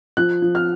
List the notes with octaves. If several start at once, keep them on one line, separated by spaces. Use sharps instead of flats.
F3 F#6
F3
F6